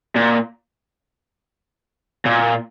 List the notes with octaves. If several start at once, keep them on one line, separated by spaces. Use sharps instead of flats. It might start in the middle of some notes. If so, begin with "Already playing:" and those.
A#2
A#2